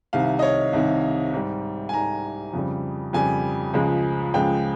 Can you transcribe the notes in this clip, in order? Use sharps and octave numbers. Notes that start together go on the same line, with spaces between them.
C2 C3 D#3 F5
D#5
C#5
C2 C3 D#3
G#2 G3
G#5
G#2 G3 A#5
F2 C#3 G3
F2 C#3 G3 G#5
C#2 C#3 F3 G#3
C#2 C#3 F3 G#3 G5